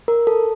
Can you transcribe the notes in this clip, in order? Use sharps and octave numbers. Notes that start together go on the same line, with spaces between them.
A#4
A4